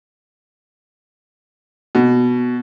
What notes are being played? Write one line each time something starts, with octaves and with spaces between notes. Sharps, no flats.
B2